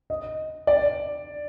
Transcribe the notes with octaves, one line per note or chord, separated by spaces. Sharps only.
D#5
D5